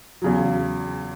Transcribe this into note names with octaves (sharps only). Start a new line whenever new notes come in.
E2 C#3 F#3